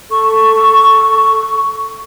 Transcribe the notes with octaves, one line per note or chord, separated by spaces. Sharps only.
A4 C#6